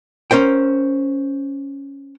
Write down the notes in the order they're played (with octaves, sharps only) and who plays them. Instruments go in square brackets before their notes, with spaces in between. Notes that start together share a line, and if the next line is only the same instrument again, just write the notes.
[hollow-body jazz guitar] C#4 A#4 C5 G5